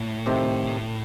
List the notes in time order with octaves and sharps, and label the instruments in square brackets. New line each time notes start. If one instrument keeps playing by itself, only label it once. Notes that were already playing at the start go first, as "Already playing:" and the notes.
Already playing: [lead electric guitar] A2
[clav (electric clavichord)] C3 D#3 A3 C4 G4